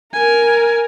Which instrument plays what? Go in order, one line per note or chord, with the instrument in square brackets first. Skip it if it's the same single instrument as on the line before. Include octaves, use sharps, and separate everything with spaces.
[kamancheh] A#4 [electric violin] G#5